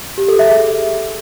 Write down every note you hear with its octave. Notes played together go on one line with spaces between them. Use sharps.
G4
A4
E5
G#4